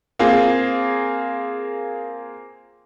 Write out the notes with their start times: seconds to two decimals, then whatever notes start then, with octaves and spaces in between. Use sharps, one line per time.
0.19 A#3 C4 F4 G#4